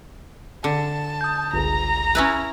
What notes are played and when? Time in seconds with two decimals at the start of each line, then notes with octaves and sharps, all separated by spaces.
0.64 D3 A5
1.21 D#6 G6
1.54 G1 C#2 G#4 A#5
2.15 C#4 E4 B4